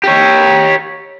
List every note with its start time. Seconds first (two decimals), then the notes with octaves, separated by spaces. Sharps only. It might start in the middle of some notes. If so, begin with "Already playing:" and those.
0.04 G4 C#5